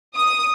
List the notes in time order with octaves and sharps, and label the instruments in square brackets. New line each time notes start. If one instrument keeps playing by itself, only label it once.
[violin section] D#6